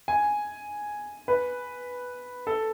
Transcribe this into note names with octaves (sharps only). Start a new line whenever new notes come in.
G#5
B4
A4